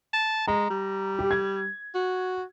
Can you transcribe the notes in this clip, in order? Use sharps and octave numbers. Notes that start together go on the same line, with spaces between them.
A5
G#3 A#5
G3
G4
G#6
F#4